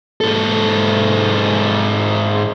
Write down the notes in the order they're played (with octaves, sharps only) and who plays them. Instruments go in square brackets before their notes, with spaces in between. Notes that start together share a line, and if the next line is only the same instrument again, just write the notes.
[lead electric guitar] G#2 A4